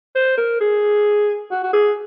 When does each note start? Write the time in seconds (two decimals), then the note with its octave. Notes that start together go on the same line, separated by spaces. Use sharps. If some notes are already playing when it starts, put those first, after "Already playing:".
0.15 C5
0.37 A#4
0.61 G#4
1.51 F#4
1.63 F#4
1.73 G#4